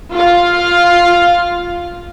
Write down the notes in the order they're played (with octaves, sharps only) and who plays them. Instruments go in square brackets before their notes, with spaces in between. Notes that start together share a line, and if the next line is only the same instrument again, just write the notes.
[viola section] F4 F5